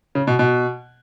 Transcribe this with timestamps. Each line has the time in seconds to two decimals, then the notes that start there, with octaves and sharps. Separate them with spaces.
0.15 C#3
0.27 B2
0.39 B2